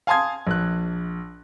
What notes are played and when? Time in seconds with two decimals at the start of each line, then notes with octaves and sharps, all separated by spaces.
0.07 F5 G#5 A5 C6 D#6 G#6
0.47 A#1 F#6